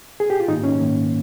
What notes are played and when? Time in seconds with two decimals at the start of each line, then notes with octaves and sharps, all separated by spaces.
0.20 G#4
0.30 G4
0.40 F4
0.48 G#2 D#3 A#3 D#4
0.64 C#4
0.80 G#2 D#3 A#3